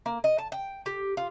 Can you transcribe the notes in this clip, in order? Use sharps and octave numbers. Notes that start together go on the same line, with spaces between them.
A#3
D#5
A5
G5
G4
F4